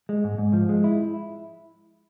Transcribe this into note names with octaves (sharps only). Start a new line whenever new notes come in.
G#3
G#2
G#2
F3
G#3
E4